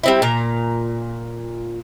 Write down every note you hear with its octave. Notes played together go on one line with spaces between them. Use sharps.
G3 C4 E4
A#2 A#5